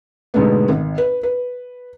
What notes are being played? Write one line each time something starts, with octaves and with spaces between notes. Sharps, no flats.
G#2 B2 D3 G#3 A3 B3
G#1
B4
B4